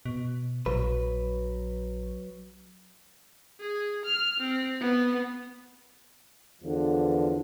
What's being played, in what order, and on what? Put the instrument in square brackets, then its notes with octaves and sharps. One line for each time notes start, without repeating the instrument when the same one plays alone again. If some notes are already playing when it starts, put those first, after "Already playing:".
[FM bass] B2
[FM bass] A#1 [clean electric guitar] F#3 B4
[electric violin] G#4
F6
C4
B3
[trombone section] E2 D3 E3 F3